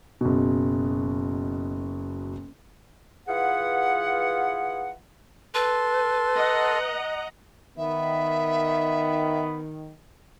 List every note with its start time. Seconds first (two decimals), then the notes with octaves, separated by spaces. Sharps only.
0.21 F#1 B2
3.29 E3 F4 G#4 B4 F#5
5.54 A4 B4 C6
6.34 D#5 F#5 A#5
7.78 D#3 B3 E5